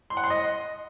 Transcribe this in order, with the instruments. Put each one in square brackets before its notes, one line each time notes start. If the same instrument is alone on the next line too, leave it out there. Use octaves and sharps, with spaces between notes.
[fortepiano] C6
F#5
C6
D#5